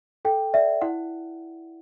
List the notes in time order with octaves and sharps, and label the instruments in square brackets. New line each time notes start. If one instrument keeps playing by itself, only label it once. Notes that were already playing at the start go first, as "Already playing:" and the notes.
[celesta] A4 G5
D5 E5
E4 F#5